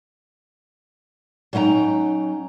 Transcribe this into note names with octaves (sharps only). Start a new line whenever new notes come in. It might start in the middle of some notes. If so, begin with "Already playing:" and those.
F#3 C#4 D#4 E4 G5 A#5